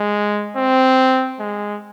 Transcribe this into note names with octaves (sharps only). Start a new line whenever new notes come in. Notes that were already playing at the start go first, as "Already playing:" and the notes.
Already playing: G#3
C4
G#3